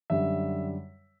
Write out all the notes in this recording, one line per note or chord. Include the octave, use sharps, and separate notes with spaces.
F#2 D3 G3 E5